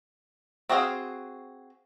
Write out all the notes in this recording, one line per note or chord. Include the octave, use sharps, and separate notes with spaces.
C4 F#4 G#4 C5 F5